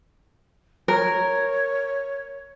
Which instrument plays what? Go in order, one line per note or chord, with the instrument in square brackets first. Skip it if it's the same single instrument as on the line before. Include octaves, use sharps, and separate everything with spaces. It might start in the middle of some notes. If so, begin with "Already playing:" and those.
[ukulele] A#4 [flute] C#5